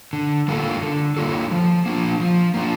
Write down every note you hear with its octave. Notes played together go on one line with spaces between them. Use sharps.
D3
G3 A#3 F4 A4
D3
G3 A#3 F4 A4
F3
A#3 D4 F4
F3
A#3 D4 F4